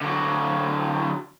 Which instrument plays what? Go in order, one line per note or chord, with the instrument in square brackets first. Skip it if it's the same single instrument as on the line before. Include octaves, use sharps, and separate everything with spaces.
[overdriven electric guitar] D3 F#3